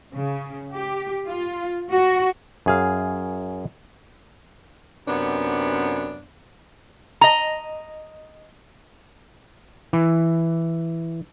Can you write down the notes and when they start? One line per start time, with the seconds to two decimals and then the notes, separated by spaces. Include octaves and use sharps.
0.13 C#3
0.73 G4
1.26 F4
1.91 F#4
2.66 F#2 G#4 F5
5.07 F#2 C3 B3 C#4 D4
7.21 D#5 A#5
9.93 E3